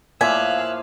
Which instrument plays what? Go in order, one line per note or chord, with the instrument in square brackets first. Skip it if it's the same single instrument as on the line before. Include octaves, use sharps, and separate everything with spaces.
[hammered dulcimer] A2 F3 A#3 [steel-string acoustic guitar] E5 [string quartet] F5 E6 F#6 [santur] G#5